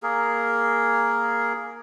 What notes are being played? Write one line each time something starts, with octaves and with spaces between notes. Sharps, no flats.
A#3 G#4 A#4